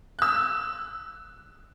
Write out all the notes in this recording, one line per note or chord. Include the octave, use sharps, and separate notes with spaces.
E6 F#6